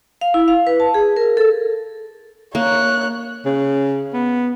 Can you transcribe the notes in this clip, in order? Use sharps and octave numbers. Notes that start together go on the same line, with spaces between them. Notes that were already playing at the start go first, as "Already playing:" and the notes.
F5
E4
F5
B4
A5
G#4
A#4
A4
A#3 C#5 F#6
C#3
B3